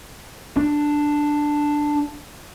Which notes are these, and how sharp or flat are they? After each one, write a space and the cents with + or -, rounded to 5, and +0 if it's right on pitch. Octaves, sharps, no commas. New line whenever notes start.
D4 +5